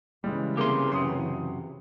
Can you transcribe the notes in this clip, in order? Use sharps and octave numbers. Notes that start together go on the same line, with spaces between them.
C#3 E3 G3 G#3
C3 A#3 G4 G#4 C6
F#2 C3 C6 D#6